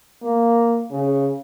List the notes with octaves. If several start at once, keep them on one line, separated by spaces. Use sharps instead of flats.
A#3
C#3